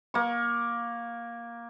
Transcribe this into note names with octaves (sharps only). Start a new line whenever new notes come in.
A#3 C#6